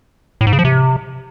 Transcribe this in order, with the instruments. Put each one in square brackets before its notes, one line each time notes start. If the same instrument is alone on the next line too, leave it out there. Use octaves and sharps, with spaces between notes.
[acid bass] A2
G#2
C#3
F3
C3